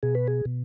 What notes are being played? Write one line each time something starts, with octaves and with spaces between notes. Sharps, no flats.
B2 G#4
B4
G#4
B2